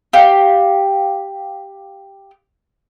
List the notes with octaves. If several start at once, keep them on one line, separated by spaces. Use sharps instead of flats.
G4 F5